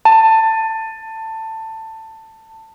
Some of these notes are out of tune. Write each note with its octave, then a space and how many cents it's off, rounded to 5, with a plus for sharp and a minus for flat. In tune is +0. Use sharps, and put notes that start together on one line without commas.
A5 +15